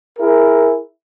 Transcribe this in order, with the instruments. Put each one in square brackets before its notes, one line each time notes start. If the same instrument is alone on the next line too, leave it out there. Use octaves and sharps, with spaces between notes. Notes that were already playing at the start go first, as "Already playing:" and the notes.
[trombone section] E4 G#4 A#4